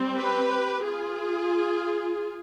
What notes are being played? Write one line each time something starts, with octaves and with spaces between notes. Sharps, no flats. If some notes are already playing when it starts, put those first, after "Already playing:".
Already playing: G3 C4
G4 B4
F4 G#4